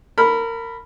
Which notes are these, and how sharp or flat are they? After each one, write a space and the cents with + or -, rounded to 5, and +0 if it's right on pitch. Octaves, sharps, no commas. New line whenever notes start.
A#4 -25 B5 +0